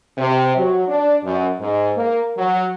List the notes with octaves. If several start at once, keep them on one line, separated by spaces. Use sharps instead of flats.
C3
F#3
D4
F#2
G#2
A#3
F#3